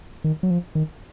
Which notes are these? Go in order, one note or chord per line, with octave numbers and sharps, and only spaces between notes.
D#3
F#3
F3
D#3